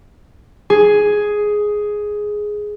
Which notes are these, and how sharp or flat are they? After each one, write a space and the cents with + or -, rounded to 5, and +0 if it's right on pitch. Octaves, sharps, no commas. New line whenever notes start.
G#4 +5